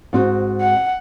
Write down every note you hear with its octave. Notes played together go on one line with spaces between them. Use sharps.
G#2 C4 F#4
F#5